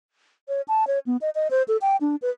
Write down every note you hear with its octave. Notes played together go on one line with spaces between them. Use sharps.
C#5
A5
C#5
B3
D#5
D#5
C5
A4
G5
D4
B4